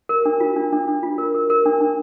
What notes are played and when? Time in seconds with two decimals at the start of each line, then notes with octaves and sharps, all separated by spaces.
0.09 A#4
0.25 D4
0.40 F4
0.56 D4
0.73 D4
0.88 D4
1.03 F4
1.18 A#4
1.35 A#4
1.50 A#4
1.66 D4
1.81 D4